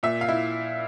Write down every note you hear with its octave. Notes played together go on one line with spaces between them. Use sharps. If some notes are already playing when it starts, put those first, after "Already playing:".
A#2 E5
F5
E4